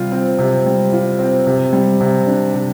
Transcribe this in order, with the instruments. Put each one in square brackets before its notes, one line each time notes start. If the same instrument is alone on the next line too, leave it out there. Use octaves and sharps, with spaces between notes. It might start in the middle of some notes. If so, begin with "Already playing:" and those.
Already playing: [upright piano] C3 G3 F4
C4
C3
G3
F4
C4
C3
G3
C3
D4
C3